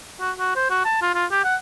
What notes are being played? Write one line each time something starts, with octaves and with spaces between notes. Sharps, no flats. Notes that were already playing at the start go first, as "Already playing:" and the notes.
F#4
F#4
C5
F#4
A5
F4
F4
G4
F#5